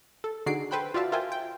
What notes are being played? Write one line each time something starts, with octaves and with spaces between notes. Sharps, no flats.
A4
D3 D#4 F#4 G#4 C7 D7
A4 B4 C5 G5 B5 F#6
F4 F#4 D5 E5 F5 A5
F4 A#4 C5 E5 G5 G#5
G5